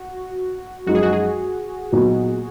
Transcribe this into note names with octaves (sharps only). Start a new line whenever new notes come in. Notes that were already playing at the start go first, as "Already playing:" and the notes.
Already playing: F#4
F#2 F3 G#3 D#4 F#4
G#4
F#4
G#4
A#2 F#3 B3 D#4 F#4